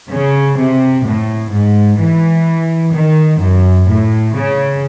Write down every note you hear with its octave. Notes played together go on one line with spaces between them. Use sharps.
C#3
C3
A2
G#2
E3
D#3
F#2
A2
C#3